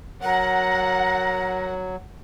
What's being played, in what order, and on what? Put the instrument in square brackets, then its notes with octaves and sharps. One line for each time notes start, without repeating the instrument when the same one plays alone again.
[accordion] F#3 [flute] A#4 [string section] F#5